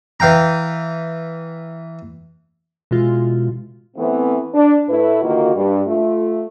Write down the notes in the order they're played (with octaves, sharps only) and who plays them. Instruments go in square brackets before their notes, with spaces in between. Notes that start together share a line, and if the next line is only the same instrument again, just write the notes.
[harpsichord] E3 F5 G5 A#5
[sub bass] B2 [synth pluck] E3 G#3 F4
[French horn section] E3 A3 B3 C4
D4
A2 A3 E4 B4
D3 D#3 A#3 F4 F#4
G2
A3 F4